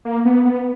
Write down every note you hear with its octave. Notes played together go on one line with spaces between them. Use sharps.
A#3
B3
B3